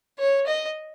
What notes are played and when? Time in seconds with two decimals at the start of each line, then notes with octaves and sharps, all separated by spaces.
0.19 C#5
0.47 D#5